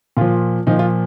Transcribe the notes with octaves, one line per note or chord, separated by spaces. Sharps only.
A#2 F3 F4
A#2 F3 D#4
F4